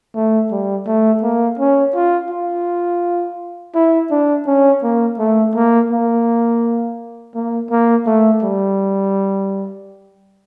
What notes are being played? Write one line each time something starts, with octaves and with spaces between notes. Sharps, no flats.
A3
G3
A3
A#3
C#4
F4
F4
E4
D4
C#4
A#3
A3
A#3
A#3
A#3
A#3
A3
G3